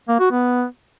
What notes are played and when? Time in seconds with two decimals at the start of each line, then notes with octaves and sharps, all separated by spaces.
0.08 A#3
0.20 F#4
0.31 B3